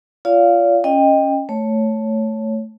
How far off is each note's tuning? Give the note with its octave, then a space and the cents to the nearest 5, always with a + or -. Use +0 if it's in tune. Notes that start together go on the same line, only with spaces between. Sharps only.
F4 -15 D5 -45 F5 +0
C#4 +0 D#5 +0 G5 +15
A3 +0 C#5 +0